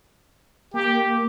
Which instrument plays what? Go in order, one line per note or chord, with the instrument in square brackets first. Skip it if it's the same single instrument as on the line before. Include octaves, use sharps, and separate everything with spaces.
[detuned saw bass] A#3 [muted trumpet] G4